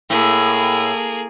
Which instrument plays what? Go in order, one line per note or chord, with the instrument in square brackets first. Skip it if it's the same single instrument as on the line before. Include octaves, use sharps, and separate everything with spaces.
[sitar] A2 [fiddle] A#3 G#4